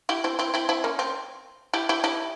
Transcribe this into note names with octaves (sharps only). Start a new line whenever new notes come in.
E4 G4
C4 E4
C4 E4
C4 E4
C4 E4
A#3 C#4
C4
E4 G4
E4 G4
E4 G4